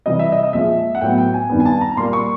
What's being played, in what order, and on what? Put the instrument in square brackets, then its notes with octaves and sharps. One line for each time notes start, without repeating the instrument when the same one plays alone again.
[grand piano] C3 E3 G3 D#5
E5
D#5
D#5
A#2 F3 G#3 E5
F#5
A2 F#3 B3 G5
G5
G#5
G2 D#3 G3 B3
G#5
A5
A#5
A#2 G3 A#3 C6
C#6